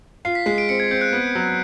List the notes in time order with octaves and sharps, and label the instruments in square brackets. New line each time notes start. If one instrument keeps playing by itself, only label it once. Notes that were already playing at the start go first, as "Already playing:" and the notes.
[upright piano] F4 [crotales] C7
[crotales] B6
[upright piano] G#3 [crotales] C7
[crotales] D7
[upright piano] C4 [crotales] C#7
[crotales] G#6
[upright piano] C4 [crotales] G6
[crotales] F#6
[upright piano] B3
F#3